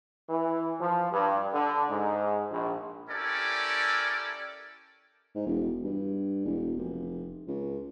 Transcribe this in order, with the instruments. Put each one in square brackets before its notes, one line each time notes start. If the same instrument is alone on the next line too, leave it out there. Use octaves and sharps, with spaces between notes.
[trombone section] E3
F3
G2
D3
G#2
A#1
[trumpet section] C#4 E4 G4 A4 A#4 D5
[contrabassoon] G#2
E1
G2
E1
F1
C#2